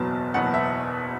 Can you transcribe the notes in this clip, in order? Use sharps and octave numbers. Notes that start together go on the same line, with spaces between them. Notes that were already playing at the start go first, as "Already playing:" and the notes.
Already playing: F#1 E2 B2 F#3 B3 A5
F#1 E2 B2 F#3 B3 F#5
E5